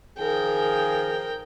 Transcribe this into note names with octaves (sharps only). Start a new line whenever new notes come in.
D#3 F3 G#4 A#4 G5